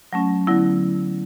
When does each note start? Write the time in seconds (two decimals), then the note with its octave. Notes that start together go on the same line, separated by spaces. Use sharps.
0.13 F#3 A3 C#4
0.47 D3 F#3 B3 E4